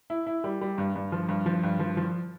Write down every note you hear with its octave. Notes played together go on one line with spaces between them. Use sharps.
E4
E4
G3
G3
G2
G2
F3
G2
F3
G2
F3
F3